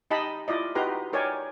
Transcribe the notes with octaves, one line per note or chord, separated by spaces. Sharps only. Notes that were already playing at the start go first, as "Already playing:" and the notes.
D#4 G4 D#5 A5 B5
E4 F4 D5 D#5
D#4 F#4 G4 B4 A#5 C6
D#4 A#4 C#5 D5 G5 G#5